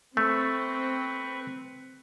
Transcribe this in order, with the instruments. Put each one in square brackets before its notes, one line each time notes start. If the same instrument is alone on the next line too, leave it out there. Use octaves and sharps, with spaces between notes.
[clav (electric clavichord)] A3 [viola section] C4 [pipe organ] B4 C#6